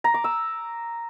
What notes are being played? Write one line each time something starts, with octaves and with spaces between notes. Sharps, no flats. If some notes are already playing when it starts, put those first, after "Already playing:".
A#5
D6
E6